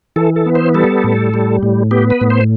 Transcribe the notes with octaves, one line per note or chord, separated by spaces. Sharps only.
E3 A4
A4
B3
C5
G3 A4
A2
G3
A2
B3 G4
B4
A2
C5